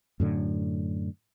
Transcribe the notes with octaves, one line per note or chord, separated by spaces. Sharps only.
F#2 A2 D3